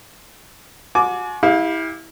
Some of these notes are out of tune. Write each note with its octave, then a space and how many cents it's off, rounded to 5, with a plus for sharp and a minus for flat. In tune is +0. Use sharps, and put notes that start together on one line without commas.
F#4 -35 G#5 +35 D6 +0
E4 -20 G4 +20 F5 +15